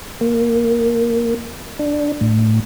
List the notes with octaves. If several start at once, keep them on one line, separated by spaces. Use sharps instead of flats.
A#3
D4
A2